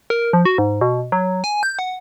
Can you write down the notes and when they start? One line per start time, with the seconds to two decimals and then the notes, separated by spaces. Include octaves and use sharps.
0.10 A#4
0.33 F3
0.45 F#4
0.58 G#2
0.81 B2
1.12 F#3
1.44 G#5
1.63 G6
1.79 F#5